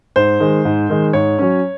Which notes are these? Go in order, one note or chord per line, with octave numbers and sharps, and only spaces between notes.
G#2 C5
D#3 G#3
G#2
D#3 G#3
G#2 C#5
F#3 C#4